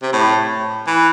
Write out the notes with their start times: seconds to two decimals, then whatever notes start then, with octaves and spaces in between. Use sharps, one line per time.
0.02 C3
0.13 A2
0.87 E3